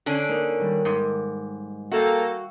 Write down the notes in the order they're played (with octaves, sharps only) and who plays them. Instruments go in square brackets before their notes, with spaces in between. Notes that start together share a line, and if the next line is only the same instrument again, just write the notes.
[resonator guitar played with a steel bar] D3 C#4 D4 [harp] B6 C7 D#7
[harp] A#3 D#4
D#3 G3
[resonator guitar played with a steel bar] G#2 [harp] D6
[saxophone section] A#3 A4 [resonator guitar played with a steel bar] F#4 [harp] E5 F5 G5